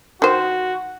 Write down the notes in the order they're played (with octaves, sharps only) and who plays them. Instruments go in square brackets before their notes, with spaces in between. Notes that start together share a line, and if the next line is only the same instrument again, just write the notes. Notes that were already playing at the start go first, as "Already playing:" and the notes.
[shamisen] D#3 C5 [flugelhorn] F#4